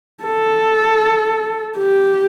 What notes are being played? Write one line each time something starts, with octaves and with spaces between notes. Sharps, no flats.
A4
G4